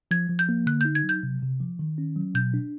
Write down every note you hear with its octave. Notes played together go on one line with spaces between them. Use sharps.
F3 G#6
F3
G6
A#3
D3 F#6
D#4 G6
G#6
F#3
G6
C3
C3
F3
D#3
C#4
F#3
B2 G6
D4